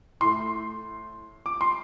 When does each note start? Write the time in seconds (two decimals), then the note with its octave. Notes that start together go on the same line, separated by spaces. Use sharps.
0.20 A2 A3 C6
1.46 D6
1.61 C6